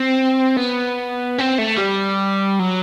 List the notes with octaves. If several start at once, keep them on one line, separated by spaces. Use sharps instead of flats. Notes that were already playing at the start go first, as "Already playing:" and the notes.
Already playing: C4
B3
C4
A3
G3
F#3